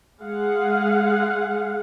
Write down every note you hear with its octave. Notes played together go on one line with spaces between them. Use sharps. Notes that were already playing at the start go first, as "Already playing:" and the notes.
G#3 G#4 F5 F#5